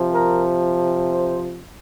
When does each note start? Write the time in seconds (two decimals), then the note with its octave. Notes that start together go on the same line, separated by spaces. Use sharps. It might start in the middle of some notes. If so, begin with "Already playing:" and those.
Already playing: C3 F3
0.12 A#4
1.12 C5